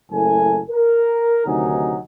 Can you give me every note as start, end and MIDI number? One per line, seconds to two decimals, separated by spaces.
0.11 0.59 30
0.11 0.59 42
0.11 0.59 45
0.11 0.59 69
0.11 0.59 80
0.70 1.42 70
1.46 1.98 38
1.46 1.98 48
1.46 1.98 51
1.46 1.98 54
1.46 1.98 63
1.46 1.98 80